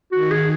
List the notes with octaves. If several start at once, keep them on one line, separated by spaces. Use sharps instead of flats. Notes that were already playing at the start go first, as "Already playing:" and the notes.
D#3 F#4
G#4